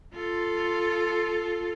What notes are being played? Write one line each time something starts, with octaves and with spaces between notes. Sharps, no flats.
F4 A4